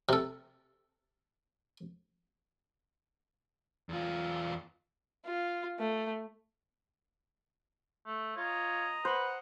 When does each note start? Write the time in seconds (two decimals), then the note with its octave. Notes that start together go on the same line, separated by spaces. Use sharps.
0.09 C3 A4
3.89 E2 F4
5.25 F4
5.79 A3
8.06 A3
8.37 F4 C#5 D#5 A#5
9.05 B4 C5 F#5